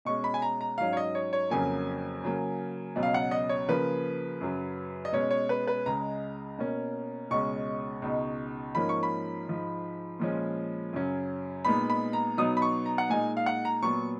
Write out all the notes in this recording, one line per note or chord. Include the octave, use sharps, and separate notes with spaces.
B2 G#3 C#4 C#6
B5
G#5
A#5
A#5
G#2 F#3 C#4 F5
C#5
D#5
C#5
C#5
F2 C#3 F#3 A#3 C#4 G#5
C#3 F#3 A#3
C#2 B2 F#3 C#4
F5
F#5
D#5
C#5
C#3 F3 A#3 B4
F#2 C#3 F#3
D#5
B2 G#3 C#4 C#5
C#5
B4
B4
C#2 C#3 G#3 A#5
B2 A#3 C#4
C#2 B2 G#3 C#4 C#6
C#2 B2 G#3 D#4
G#2 F3 A#3 C#4 B5
C#6
B5
G#2 F3 G#3
A#2 F3 G#3 C#4
F#2 C#3 F#3 C#4
A#2 G#3 B3 D#4 B5
B5
A#5
B2 F#3 B3 D#4 D#6
B5
C#6
A#5
F#5
A#2 G#3 D#4 G#5
F5
F#5
A#5
A#2 F#3 B3 C#6